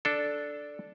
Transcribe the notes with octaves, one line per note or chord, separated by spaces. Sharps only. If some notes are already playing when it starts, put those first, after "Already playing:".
D4 A4